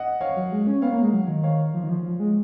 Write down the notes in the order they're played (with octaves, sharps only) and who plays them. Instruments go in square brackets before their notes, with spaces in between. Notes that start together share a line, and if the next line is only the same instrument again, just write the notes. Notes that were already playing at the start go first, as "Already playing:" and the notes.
Already playing: [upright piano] D#5 F#5
C#5 F5
[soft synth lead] F#3
G#3
C#4
[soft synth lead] B3 [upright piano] C#5 F5
[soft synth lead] A#3
G#3
F#3
D#3
[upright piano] C#5 F5
[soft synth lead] F3
D#3
F3
F3
G#3